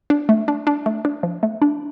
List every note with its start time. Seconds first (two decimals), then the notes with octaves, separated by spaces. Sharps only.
0.10 D4
0.29 A3
0.48 D4
0.67 D4
0.86 A3
1.05 D4
1.23 F3
1.43 A3
1.62 D4